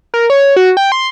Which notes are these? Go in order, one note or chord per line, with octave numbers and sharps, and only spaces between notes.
A#4
C#5
F#4
G5
C6